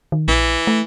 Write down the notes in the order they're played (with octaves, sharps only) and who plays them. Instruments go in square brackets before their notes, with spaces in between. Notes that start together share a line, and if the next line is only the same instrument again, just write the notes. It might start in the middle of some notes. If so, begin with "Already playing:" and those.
[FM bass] D#3
[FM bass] A#1 [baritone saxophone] E3
[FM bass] A3